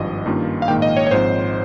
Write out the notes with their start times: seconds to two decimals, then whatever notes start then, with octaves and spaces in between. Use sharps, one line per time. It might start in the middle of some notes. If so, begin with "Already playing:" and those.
Already playing: G#1 G2 F3 D#5
0.26 G2 D#3 A#3 C#4 F4
0.62 F5
0.68 A#1 G#2 D#3 A#3 G5
0.82 D#5
0.97 C#5
1.07 C#5
1.10 G#1 G#2 F3 C4 C5